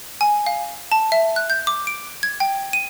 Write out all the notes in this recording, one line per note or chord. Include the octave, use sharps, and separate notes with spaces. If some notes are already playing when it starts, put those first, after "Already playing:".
G#5
F5
A5
E5
F#6
G6
D6
D7
G#6
G5
D#7